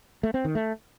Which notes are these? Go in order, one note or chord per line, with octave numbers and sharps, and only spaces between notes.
A3
C4
D#3
A3